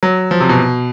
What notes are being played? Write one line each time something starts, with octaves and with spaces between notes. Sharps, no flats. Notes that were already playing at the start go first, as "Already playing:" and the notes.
F#3
F3
C3
B2